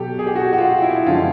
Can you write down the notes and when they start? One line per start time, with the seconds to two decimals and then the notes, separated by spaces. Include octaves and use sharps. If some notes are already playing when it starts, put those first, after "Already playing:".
Already playing: B2 F#3 G4 A4
0.19 G#4
0.27 G4
0.36 F#4
0.53 F#4
0.58 F4
0.82 E4
1.06 F#2 D3 F3 G#3 F4